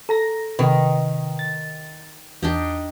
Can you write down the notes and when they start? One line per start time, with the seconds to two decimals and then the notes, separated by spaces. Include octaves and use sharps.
0.09 A4 A#5 A#6
0.59 C3 D#3 B4
1.39 A6
2.43 E2 D4 D#4 G4